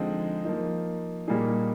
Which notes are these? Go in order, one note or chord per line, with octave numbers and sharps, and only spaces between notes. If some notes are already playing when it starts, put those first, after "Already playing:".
Already playing: D3 F3 G#3 C4 D#4
F3 A#3 D#4
A#2 G3 A#3 D#4 G#4